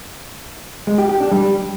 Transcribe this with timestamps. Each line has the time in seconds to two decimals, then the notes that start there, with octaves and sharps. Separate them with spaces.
0.87 G#3
0.98 G4
1.09 G4
1.20 D4
1.32 G3